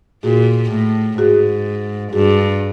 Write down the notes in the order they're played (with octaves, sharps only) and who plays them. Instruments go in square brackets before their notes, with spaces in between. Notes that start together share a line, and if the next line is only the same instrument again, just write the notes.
[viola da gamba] A#2 [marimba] F#4 G#4
[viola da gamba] A2
[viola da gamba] G#2 [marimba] F#4 G#4
[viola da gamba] G2 [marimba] F#4 G#4